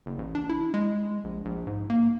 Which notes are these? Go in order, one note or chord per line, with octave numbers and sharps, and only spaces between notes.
F#1
A1
D4
E4
G#3
A#1
A#1
G#2
A#3